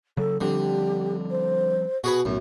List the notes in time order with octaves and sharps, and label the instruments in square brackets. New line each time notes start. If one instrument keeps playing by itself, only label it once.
[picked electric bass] C#3 F#3 [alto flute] A4
[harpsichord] D3 [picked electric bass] F3 G3 C4 [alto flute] G4
[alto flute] C5
[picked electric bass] B2 [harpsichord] F#4 G#4 B4
[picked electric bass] B1 A2 [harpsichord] F#2 [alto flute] B3